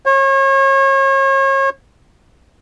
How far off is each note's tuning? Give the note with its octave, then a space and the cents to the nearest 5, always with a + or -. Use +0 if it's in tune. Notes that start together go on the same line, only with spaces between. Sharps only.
C#5 -35